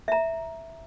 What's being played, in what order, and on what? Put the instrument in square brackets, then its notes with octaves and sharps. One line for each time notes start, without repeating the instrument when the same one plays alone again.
[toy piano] E5 A#5